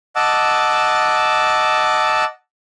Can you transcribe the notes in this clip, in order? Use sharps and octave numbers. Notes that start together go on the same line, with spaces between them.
D#5 F#5 A5 D6 E6